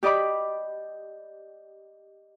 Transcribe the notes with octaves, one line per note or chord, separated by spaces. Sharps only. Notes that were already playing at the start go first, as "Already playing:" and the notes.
G4 D5 D#5 B5 D6